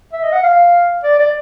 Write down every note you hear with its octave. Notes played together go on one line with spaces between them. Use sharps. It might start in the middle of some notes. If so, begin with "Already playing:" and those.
E5
D#5
F#5
F5
D5
D5